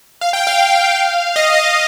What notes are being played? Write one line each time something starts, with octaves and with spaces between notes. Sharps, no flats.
F5
G5
F5
F5
D#5
F5